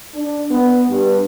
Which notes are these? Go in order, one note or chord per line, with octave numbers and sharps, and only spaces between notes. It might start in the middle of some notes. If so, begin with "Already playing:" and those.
D4
B3
G2